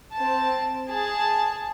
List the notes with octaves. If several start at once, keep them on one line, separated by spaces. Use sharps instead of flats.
C4 A5
G#4 A5